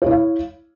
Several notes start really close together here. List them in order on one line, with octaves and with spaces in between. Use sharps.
C#5 E4 F5